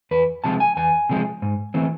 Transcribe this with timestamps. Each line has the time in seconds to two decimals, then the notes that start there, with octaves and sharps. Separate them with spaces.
0.11 E2 B4
0.44 C3 F3 G#3 A5
0.60 G#5
0.77 E2 G#5
1.10 C3 F3 G#3
1.42 G#2
1.74 E3 A3 C4